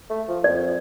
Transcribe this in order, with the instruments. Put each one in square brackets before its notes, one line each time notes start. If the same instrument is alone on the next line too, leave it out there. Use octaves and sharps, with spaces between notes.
[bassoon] A3
F3
[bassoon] F2 [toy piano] D5